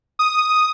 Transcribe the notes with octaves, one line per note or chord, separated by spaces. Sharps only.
D#6